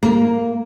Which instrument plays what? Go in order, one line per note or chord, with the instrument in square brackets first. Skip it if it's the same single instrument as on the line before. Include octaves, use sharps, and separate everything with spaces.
[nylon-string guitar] A#3